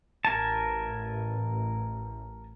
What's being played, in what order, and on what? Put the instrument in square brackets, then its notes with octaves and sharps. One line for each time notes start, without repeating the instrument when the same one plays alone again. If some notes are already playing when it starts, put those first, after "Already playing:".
[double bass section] A1 [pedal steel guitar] A#4 G#5 A5